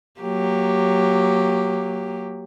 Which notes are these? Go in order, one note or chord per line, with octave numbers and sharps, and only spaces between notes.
F#3 A#3 G4